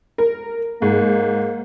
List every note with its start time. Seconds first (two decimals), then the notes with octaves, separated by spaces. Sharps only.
0.18 A#4
0.82 G#2 A#3